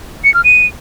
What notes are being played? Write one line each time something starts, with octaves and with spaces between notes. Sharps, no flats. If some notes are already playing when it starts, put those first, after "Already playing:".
C#7
F6
D#7